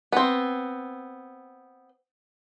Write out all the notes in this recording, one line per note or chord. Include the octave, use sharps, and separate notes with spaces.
B3 C4